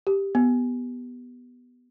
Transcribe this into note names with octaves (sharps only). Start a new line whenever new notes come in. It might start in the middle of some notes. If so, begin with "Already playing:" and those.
G4
B3